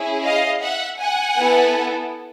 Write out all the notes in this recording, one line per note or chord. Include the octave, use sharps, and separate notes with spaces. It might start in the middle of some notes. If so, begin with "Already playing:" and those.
Already playing: C#4 E4 G#4
D#5 F5
E5 F#5
F#5 G#5
B3 E4 A4